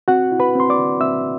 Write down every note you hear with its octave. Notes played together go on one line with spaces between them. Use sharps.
C4 F#4 F#5
E4
B4 B5
C4 C6
D5 D6
D3
C4 E5 E6